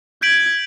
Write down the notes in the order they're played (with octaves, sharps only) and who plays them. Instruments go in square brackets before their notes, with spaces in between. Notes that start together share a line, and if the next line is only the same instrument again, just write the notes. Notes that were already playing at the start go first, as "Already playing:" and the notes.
[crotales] G6 B6 D7 F#7 [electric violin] G#6